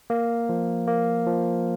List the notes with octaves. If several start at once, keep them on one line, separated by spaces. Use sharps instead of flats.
A#3
F3
A#3
F3